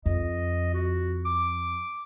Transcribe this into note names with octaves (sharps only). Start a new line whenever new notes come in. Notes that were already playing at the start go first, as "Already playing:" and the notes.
F2 D#5
F#4
D6